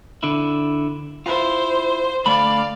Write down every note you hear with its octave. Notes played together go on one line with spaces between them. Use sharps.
D3 E4
E4 F4 C5
D2 A3 D5 F5 B5